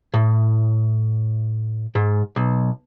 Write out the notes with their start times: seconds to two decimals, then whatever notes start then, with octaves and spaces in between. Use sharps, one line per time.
0.14 A2
1.95 G#2
2.36 B1